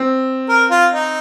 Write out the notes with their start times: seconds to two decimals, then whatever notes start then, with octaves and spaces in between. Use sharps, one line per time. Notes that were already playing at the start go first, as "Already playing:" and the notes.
Already playing: C4
0.49 A#4
0.70 F4
0.93 D#4